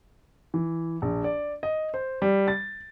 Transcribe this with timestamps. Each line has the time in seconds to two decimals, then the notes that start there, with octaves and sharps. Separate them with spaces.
0.54 E3
1.02 A#1
1.24 D5
1.63 D#5
1.94 C5
2.22 G3
2.48 A6